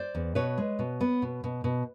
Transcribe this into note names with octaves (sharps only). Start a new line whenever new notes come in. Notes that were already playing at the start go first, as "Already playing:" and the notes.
Already playing: C5 D5
E2
B2 B4 C#5
G#3
B2
B3
B2
B2
B2